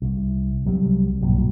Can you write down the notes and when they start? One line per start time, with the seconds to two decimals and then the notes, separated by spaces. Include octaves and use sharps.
0.02 C2
0.66 C2 F#3 G3 C4
1.22 B1 G2 A#2 F#3